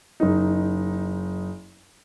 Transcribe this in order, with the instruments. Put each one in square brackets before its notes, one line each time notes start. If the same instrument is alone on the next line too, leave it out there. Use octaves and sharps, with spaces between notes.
[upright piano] F#1 D#4